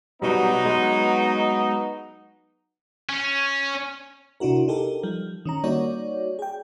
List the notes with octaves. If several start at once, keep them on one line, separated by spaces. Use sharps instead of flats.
B2 F#3 G3 B3 D#4
G#3
C#4
C3 D4 E4 F#4 A#4
D#4 G4 A4 A#4
F3 G3
D#3 C#4 A#5
G3 A#3 D#4 F#4 C#5 D5
G#4 G5